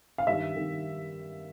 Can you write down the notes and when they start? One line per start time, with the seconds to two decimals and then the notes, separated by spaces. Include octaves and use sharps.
0.18 F5
0.27 G2 D#3 E5
0.56 G2 D#3